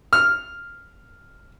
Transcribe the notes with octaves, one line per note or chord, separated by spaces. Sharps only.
F6